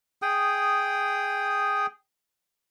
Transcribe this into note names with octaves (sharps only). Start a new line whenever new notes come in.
G#4 G5 D#6